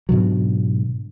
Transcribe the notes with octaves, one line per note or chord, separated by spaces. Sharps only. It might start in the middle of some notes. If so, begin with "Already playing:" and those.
G#2 B2 D3 F#3